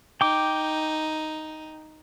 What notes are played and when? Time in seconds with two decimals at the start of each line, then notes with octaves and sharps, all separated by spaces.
0.21 D#4 G5 D6